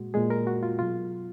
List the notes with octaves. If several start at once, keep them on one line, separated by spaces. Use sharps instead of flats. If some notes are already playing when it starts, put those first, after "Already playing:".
Already playing: A#2 G#3 F#4
A#2 G#3 G#4
A#4
F#4
F4
B2 F#3 F4